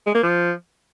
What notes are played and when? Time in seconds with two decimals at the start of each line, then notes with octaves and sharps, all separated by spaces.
0.07 G#3
0.15 A#3
0.23 F3